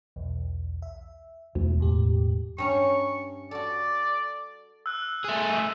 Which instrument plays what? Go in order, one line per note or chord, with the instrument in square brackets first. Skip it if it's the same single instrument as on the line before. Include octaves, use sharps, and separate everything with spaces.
[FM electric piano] B1 E2
E5
[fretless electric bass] E1 [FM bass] D2
[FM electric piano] A2 G4
[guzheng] G2 C#4 A#5 [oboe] C#6
[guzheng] F#4 A4 [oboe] D5
[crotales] E6 F#6
[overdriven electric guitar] A3 G#4